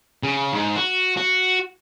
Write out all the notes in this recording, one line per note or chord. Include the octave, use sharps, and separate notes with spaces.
C#3
G#2
F#4
F#4